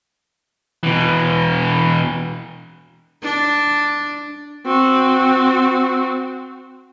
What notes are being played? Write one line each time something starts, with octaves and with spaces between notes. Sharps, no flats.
B2 E3
D4
C4 F#4